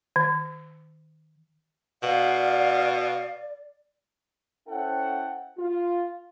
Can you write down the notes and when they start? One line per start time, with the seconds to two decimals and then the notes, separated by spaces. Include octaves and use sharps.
0.16 D#3
2.03 B2 D5 F5 F#5
4.69 C#4 E4 A4 C5 F#5 G5
5.58 F4